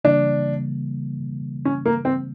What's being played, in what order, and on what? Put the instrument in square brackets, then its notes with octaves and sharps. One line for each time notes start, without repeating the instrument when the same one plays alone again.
[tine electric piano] C#3 E3 G3 A#3 [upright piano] D4
[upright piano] C#4
A#3
C4